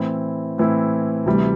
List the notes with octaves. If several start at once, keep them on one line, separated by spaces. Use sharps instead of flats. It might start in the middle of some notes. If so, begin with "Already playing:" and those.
Already playing: A2 E3 C4 E4
A2 E3 C4 E4
D2 C3 E3 G3